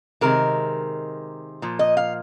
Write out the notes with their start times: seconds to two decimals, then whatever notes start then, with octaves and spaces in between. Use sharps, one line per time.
0.21 C3 D#3 G#3 A#4
1.62 A#2 F3
1.79 D#5
1.97 F5